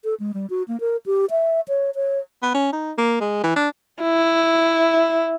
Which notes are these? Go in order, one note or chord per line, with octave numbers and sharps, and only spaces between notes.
A4
G#3
G3
F#4
A#3
A#4
G4
E5
C#5
C#5
B3
C#4
D#4
A#3
G#3
E3
D4
E4